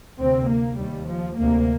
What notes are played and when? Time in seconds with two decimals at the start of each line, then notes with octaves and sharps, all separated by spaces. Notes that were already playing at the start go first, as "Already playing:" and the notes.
0.20 D2 C3 C4
0.50 A#3
0.79 D#2 G3
1.09 F3
1.39 D2 C3 A#3